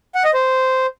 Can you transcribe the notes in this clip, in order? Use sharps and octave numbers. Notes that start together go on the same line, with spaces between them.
F#5
D#5
C5